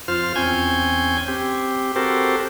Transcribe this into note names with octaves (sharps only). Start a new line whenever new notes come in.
F2 F4 C5 F6
E2 C4 C#4 G#5 G6 G#6
C4 G4
C4 F#4 G4 A4 A#4 C5